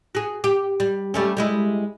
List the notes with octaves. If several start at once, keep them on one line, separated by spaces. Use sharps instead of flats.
F#4 G#4
G4
G3
G3 A3 C#4
G3 G#3 E4